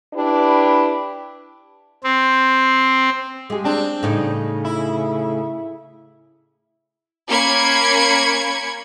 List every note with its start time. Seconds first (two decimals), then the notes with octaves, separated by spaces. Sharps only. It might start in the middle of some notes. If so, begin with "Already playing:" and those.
0.13 D4 E4 G4 B4
2.03 C4
3.50 G#3 G4 G#4
3.64 C4 D4
4.03 A2 C#3 D#4 D5
4.65 E4
7.28 A#3 C#4 B5 G#6 C#7